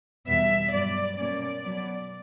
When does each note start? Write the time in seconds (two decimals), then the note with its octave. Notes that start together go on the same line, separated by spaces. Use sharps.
0.27 E2 B2 G3 B3 E5
0.72 G2 F#3 B3 D5
1.18 B2 A#3 C#4 D5
1.64 B2 F#3 B3